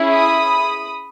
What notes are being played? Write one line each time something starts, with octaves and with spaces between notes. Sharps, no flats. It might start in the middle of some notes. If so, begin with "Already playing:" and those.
Already playing: C#4 E4 G#4
B5 D#6